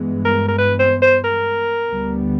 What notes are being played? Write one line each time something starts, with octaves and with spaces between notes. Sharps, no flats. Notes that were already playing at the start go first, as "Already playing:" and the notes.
Already playing: G2 E3 G#3 B3
A#4
A#4
B4
C5
C5
A#4
D2 D3 G3 B3